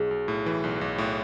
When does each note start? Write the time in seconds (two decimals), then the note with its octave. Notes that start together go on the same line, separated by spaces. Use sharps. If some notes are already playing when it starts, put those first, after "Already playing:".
Already playing: B1 G#4
0.11 B1
0.28 A2
0.46 E3
0.64 B1
0.81 B1
0.98 A2